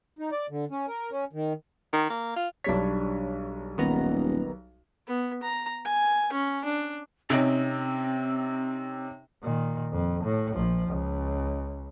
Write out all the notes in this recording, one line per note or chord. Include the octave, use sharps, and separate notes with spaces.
D#4
D5
D3
C#4
A#4
C#4
D#3
D#3
A#3
F4
B1 G3 D4 C#5 B6
D#1 D#3 B3 A#5
B3
A#5
G#5
C#4
D4
C3 C4 C#4 D#4
A#2 D#3
F2
A2
A#1 F3
C#2